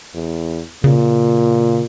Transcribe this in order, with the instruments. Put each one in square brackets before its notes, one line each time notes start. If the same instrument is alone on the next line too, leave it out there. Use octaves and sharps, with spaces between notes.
[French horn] E2
[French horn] A#2 [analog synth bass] C#3